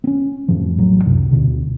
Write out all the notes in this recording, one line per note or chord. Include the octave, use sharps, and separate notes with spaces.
C4 C#4
F2 A2 F3
A1 F#3
C#2 F#2 C3
D2 B2 D3